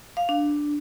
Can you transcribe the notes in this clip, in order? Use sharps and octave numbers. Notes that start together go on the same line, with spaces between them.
F5
D4